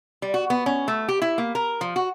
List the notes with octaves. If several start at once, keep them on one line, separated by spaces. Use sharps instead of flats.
G3
F#4
B3
C#4
A3
G4
E4
A#3
A#4
F3
F#4